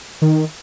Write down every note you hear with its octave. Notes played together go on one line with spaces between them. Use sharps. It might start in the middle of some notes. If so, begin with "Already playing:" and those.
D#3